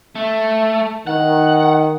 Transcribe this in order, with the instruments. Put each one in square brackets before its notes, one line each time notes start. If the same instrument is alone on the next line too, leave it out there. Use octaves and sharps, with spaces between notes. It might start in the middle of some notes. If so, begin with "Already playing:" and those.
[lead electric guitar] A3
[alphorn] D#3 [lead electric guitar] F#5